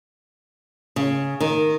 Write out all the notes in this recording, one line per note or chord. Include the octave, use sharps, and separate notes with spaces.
C#3
D#3